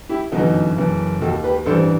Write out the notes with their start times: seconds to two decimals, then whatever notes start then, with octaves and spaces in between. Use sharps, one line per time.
0.09 E4 G4
0.32 G1 F#2 E3 D#4 F#4
0.76 F#1 F#2 E3
1.21 D#2 D#3 F#4 A4
1.44 G4 B4
1.66 A1 G2 E3 A4 C5